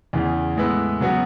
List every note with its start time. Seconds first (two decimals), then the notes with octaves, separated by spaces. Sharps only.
0.13 E2 C#3 E3
0.57 A2 G#3 B3 E4 B4
1.01 C#3 F#3 B3 F#4